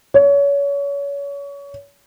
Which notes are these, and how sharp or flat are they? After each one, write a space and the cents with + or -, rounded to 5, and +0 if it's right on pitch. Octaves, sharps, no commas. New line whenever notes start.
C#5 +30